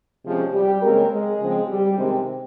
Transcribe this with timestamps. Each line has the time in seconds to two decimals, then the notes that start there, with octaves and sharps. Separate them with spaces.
0.24 C3 F3 G#3 C#4
0.53 G3 G4
0.81 C#3 G#3 A#3 C4 A#4
1.10 G#3 G#4
1.39 C#3 F3 G#3 C4
1.68 G3 G4
1.97 C3 D#3 G#3 C4